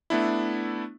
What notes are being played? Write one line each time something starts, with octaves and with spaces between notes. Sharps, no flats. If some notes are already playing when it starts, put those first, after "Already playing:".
A3 B3 D4 E4